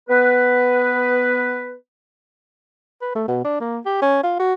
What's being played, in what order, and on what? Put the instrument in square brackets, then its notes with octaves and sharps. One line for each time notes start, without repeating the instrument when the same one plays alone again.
[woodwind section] B3 B4
[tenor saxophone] B4
A3
B2
D4
A#3
G4
C#4
F4
F#4